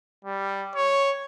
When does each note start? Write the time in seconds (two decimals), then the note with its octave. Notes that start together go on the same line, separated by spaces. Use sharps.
0.25 G3
0.75 C#5